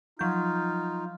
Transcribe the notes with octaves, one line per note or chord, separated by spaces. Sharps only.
F3 F#3 D#4 F4 G6